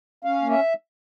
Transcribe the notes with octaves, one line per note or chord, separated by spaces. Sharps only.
C#4 F5
A#3
E5